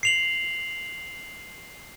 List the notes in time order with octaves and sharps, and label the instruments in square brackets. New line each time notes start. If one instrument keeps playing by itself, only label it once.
[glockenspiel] C7 F7 F#7